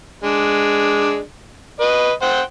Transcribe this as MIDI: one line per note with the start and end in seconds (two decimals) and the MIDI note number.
0.24 1.19 56
0.24 1.19 62
1.81 2.12 71
1.81 2.12 75
2.22 2.41 72
2.22 2.41 78
2.22 2.41 79